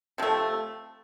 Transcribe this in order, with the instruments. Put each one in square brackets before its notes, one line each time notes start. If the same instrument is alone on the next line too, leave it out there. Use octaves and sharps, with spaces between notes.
[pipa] C3 F3 A3